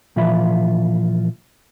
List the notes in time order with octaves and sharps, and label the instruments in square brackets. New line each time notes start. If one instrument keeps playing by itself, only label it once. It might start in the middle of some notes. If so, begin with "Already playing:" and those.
[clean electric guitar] A#2 E3 F3 F4 E5 B5